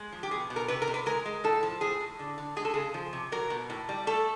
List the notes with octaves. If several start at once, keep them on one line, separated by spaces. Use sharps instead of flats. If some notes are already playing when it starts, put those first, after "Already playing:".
Already playing: G#3
F3
G4
B2 G#4
B2
A#4
C3 B4
A#4
C3
B4
G#3 A#4
G#3
A2 A4
F3
A2 G#4
A2
D3
D3
G#3 G#4
A4
C#3 G#4
F3
C3
F#3 A#4
B2
A2
G3
A3 A4